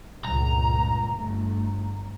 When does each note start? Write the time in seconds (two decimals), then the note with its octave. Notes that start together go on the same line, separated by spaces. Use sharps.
0.25 C#2 G2 A#2 A#5
1.17 G1 A3